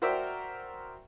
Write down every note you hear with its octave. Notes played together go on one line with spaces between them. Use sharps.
F#4 A#4 C5 D5 E5 G5